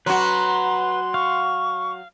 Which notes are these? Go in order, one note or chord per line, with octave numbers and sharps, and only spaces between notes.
F#3 F#4 B4 A#5 C6
F5 C#6